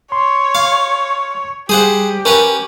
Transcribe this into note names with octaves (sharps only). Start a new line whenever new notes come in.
C#5 C6
F5
G3 G4 G#4 C5 F#5
C#4 A#4 B4 F#5